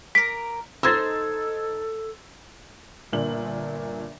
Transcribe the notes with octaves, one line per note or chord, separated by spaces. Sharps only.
A#4 D6 B6
D#4 A4 C5 E6 G#6 A6
G1 A#2 D4 F#7